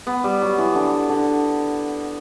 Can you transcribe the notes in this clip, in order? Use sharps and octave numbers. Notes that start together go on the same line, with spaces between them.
B3
G3
F#3
E3
D3
D3